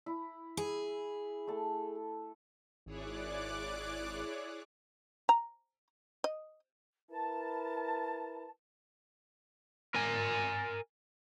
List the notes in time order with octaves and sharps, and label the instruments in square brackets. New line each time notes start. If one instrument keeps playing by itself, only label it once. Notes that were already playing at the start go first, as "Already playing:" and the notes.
[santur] E4
[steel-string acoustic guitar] G#4
[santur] A3 A4
[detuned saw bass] G#1 [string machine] E4 G#4 C#5 [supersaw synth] D5 D6 F#6
[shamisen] A#5
D#5
[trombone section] E4 A#4 B4 [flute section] A5
[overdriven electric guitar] A#4 G#5